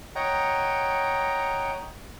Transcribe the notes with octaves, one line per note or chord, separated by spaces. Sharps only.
C#5 D#5 F#5 G5 A#5